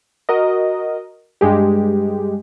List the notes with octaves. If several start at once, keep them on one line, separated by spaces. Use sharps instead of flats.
F#4 A#4 D#5
G2 G#3 G4